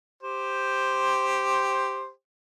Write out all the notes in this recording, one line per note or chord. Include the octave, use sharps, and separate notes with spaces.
G4 C5